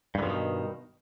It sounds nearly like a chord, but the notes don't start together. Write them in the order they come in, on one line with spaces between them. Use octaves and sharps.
G2 D3 F3 B2 D#3